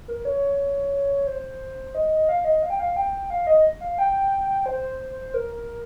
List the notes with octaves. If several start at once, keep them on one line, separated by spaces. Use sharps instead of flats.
A#4
C#5
C5
D#5
F5
D#5
F5
G5
F5
G5
F5
D#5
F5
G5
C5
A#4